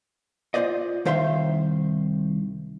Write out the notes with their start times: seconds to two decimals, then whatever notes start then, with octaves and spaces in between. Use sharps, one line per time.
0.54 F4 G4 C5 D5 D#5
1.05 C2 D#3 C5 E5 F5 C6